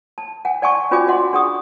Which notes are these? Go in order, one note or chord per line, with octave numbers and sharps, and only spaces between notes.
A5
F#5 G#5
D5 F#5 G#5 A5 C#6
C#4 F4 F#4 D5 G#5 D6
D5 D#5 F#5 C6
D4 G#4 F#5 C#6 D#6